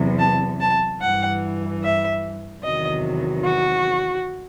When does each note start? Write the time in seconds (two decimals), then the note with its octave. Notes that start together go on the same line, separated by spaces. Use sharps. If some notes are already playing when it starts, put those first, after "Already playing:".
Already playing: E2 C3 F#3
0.18 A5
0.60 A5
1.00 G2 E3 F#5
1.82 E5
2.62 E2 C3 D#3 F#3 D#5
3.43 F#4